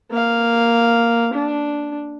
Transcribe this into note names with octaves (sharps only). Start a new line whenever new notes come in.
A#3 F5
D4